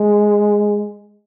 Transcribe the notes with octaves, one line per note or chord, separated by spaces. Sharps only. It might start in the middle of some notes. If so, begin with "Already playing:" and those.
Already playing: G#3